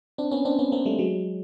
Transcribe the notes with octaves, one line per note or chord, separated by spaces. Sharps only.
C4 D4
B3 C#4
C4 D4
B3 C#4
A#3 C4
G3 A3
F#3 G#3